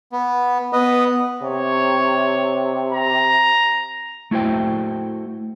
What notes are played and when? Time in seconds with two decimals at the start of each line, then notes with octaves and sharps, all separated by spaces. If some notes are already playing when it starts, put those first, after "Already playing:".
0.12 B3
0.73 B3 B4 D#5
1.42 C3 C#5
2.93 A#5
4.31 A3 E4 F#4 C5 G5